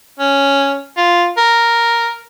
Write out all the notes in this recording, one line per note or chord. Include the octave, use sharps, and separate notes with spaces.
C#4
F4
A#4